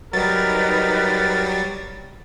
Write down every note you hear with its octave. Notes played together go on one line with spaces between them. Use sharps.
F#3 G3 D#4 A#4 B4 A6